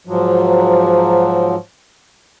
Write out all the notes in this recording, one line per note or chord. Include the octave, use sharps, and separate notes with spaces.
G#2 F3 F#3